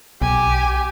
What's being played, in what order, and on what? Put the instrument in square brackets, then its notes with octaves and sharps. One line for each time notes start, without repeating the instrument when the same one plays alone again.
[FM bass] B1 [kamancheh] G4 G#5